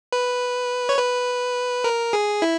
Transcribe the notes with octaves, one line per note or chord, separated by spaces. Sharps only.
B4
C#5
B4
A#4
G#4
E4